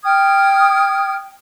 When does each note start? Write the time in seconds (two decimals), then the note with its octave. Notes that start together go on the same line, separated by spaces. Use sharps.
0.04 G5 D#6 F6 G#6